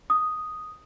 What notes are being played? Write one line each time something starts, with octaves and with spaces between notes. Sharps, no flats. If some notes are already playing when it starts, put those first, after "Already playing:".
D#6